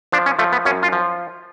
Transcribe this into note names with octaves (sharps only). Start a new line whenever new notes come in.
F3 D4
C#4
F3 A3
B3
F#2 C#4
F4
F3